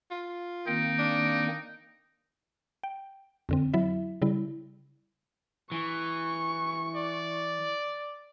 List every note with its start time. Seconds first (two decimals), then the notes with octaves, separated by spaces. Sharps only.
0.11 F4
0.67 D#3 A#3 C4 D#4 D7
0.98 D4
2.83 G5
3.49 F2 D3 C4
3.74 F#3 E4 E5
4.22 C#3 G3 E4
5.72 E3 C#6
6.95 D5